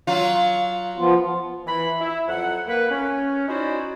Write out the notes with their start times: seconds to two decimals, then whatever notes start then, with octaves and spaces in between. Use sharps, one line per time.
0.07 F#3 F4
0.97 F3 B3 F4
1.66 E3 B5
2.01 E4
2.27 F2 F#3 F#5
2.68 A#3 B4
2.90 C#4
3.49 C#4 D#4 E4 F#4 C5 D5